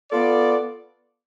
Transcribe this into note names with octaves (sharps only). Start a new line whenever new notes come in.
B3 F4 A4 D5